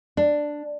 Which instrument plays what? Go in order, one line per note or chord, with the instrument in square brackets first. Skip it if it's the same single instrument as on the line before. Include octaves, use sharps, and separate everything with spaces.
[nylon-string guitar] D4